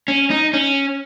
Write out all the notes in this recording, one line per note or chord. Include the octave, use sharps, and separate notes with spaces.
C#4
D#4
C#4